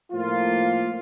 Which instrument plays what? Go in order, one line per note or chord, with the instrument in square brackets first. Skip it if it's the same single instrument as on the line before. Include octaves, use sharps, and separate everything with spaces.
[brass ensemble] A2 F3 A#3 F4